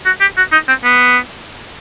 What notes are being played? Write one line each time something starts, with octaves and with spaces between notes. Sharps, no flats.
F#4
G4
F#4
D#4
C4
B3